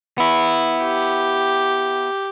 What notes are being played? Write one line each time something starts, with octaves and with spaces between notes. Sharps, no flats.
B3 E4
G4